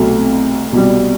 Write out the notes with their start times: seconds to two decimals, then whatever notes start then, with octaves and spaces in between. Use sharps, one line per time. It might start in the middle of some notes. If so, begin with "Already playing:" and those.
Already playing: C2 B2 F#3 A3
0.72 C2 B2 G3